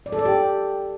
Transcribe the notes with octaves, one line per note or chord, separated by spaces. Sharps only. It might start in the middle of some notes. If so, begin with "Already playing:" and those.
D5
A4
D5
G4